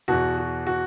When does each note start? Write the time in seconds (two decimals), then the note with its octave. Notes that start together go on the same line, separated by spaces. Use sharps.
0.08 E2 B2 F#4
0.38 F#4
0.67 F#4